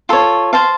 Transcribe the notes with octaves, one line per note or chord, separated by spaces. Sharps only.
F4 A4 C#5
C5 F5 A5